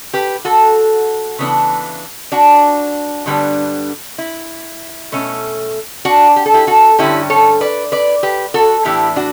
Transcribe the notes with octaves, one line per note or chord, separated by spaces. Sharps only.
G4 B4
F#4 A4
C#3 E3 B3 D4
D4 F#4
G2 D3 G3 B3
E4
B2 A3 C#4
D4 F#4
G4
A4
E4 G4
F#4 A4
G2 D3 F#3 C#4 E4 G4
A4 C#5
B4 D5
B4 D5
G4 B4
F#4 A4
A2 E3 B3 D4 E4 G4
D4 F#4